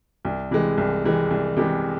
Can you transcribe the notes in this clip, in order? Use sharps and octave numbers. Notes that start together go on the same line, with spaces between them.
C2
C3 E3 G#3
C2
C3 E3 G#3
C2
C3 E3 G#3